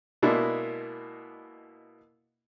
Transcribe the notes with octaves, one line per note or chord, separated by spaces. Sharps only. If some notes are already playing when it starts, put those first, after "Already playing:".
B2 G#3 A#3 D4 E4